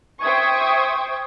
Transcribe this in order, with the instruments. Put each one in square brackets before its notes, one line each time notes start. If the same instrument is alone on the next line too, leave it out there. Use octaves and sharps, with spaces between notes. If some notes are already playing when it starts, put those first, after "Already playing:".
[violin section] C5 E5 G5 C#6 D#6 G#6